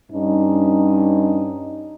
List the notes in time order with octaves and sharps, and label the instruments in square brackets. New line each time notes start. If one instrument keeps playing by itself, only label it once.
[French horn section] G2 C#4 D#4